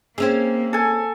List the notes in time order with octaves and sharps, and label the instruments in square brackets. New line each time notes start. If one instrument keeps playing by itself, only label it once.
[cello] A#3 [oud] C4 C#4 G#4 [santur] E5
[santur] A4 G#5